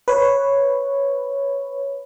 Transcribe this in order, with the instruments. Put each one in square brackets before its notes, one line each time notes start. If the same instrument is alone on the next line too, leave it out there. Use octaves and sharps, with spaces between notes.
[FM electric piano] B4 C#5